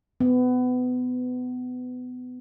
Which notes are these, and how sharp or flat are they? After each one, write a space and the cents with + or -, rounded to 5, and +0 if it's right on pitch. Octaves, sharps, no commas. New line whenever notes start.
B3 +25